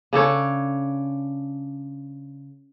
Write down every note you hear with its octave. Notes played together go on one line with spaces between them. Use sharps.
C#3 D4 A4 C#5